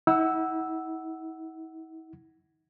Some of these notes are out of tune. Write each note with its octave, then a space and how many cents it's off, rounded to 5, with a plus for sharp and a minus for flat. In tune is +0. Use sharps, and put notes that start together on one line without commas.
E4 -40 F#5 +10 E6 -5